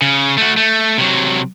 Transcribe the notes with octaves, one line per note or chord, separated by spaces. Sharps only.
C#3
A3 F#4
A3
C3 F#3